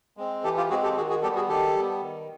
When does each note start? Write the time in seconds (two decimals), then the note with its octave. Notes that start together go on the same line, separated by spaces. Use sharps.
0.17 G#3 C4
0.44 E3 G4 A4
0.57 F4 G4
0.70 G#3 C4 F#4 G#4
0.83 G4 A4
0.96 D#3 F#4 G#4
1.10 F#4 G#4
1.22 G3 B3 G4 A4
1.36 F#4 G#4
1.49 D#3 G4 A4
1.75 G3 B3
2.01 D#3